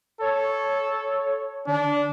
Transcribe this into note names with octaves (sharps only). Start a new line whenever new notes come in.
A4 C#5
D3 D4